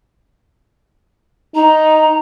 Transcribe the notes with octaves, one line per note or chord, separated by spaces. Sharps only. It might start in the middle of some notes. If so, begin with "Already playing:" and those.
D#4 A#5